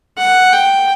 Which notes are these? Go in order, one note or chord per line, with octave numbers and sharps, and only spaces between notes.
F#5
G5